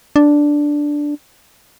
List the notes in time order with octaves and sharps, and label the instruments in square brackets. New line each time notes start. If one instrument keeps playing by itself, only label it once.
[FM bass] D4